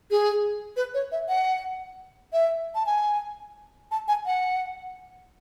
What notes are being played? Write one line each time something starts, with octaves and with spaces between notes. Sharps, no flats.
G#4
B4
C#5
E5
F#5
E5
A5
G#5
A5
G#5
F#5